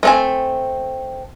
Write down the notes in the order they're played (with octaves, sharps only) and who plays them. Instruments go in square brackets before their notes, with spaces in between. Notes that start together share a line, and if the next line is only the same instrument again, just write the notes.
[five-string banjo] A3 C4 G#5